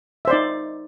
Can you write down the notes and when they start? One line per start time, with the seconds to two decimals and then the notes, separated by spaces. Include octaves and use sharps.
0.25 E5
0.27 C5
0.30 D5
0.33 D#4